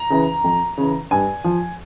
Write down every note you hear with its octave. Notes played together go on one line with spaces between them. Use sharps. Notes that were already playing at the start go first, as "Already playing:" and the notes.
Already playing: A#5
C#3 E3
F2
C#3 E3
G2 G#5
F3